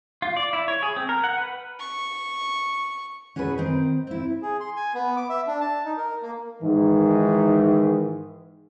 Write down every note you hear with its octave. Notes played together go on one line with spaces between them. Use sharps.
F4
D5
E4
C#5
G#4
C4
A#4
F#5
B4
C#6
C#4 F#4 G#4 A4 B4
D#3 C4
C4 E4
G#4
C6
G#5
B3
D6
E5
D4
A5
D#4
A#4
A#3
G#2 D#3 E3